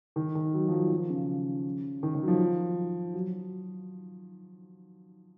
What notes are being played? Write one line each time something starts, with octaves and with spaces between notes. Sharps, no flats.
D#3
D#3
F#3
F3
F#3
F3
C#3
D#3
D#3
F#3
F3
F#3